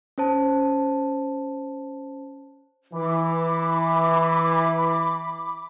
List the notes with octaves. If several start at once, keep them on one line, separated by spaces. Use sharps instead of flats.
C#4 C5 A5
E3 B5 D6